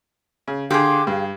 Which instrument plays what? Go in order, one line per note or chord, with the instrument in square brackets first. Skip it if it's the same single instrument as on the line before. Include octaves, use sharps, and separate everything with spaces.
[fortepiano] C#3
[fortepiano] D3 [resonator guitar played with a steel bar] G4 G#4 [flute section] F5 C6 D6
[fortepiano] G2 [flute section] F5